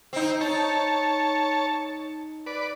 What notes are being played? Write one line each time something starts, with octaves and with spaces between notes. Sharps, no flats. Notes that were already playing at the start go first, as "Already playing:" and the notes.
C4 D#4
D#4 C#5 A5
B4 D5